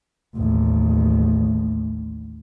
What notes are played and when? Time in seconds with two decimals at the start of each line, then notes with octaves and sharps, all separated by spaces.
0.35 A1 D#2